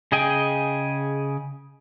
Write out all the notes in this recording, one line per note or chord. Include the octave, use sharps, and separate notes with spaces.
C#3 G#4 D#5 G5 G#5